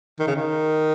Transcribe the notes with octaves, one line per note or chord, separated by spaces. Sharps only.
D#3
C#3
D#3